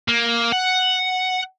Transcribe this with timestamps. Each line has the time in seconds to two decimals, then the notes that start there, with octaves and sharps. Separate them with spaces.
0.08 A#3
0.52 F#5